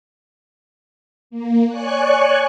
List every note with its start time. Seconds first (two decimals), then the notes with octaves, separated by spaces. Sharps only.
1.30 A#3
1.68 C#5 D5 G#5 C#6 F#6